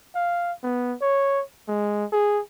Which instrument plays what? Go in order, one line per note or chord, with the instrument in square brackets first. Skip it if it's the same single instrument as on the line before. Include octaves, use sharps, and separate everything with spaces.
[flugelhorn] F5
B3
C#5
G#3
G#4